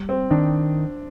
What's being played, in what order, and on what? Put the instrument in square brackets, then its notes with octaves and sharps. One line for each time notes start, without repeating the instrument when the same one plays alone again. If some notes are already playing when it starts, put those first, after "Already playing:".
Already playing: [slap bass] G3
[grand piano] C4
[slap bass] D#3 [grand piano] D4